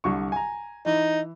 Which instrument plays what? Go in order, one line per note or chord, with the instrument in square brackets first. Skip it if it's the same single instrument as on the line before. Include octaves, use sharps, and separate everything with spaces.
[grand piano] C2 D3 C#6
G#5 A#5
[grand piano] E3 [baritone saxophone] D#4